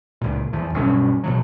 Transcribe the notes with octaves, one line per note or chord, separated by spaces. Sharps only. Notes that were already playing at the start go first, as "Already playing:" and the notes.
C#2 A#2
E2 E3 F3
B1 G2 B2 C#4
B2 F3 F#3